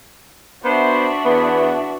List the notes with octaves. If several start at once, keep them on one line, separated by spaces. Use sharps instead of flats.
B3 D4 F#4 C5 E5
E2 B3